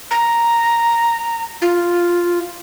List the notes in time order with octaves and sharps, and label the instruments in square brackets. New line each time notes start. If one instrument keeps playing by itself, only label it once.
[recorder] A#5
F4